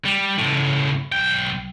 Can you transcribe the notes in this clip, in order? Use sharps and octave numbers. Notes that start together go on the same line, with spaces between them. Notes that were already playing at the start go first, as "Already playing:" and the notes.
G3
C#2 A2
B1 G5